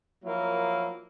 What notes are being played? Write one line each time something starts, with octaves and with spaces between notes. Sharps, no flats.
F3 F#3 A#3 E4 A#4